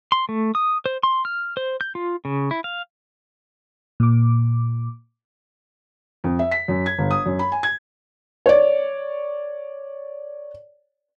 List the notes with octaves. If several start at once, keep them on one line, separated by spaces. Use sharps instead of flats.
C6
A3
D#6
C5
C6
F6
C5
G6
F4
C#3
E4
F5
A#2 D6
F2
E5
B6
F#2
G#6
G1
D#6
F#2
B5
G#5
G#6
C#5 D5